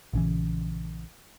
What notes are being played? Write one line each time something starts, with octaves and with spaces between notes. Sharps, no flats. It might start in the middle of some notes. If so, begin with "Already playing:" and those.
A#1 C#3 E3